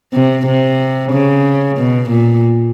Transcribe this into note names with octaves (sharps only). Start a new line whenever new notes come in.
C3
C3
C#3
B2
A#2